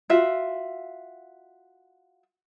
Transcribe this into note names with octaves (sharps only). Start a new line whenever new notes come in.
F4 F#4 E5